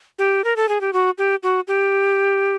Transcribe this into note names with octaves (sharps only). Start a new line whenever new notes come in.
G4
A#4
A4
G#4
G4
F#4
G4
F#4
G4